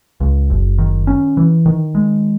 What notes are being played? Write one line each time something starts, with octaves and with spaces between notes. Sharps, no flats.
C#2
F#1
D#3
C#4
E3
D#3
G#3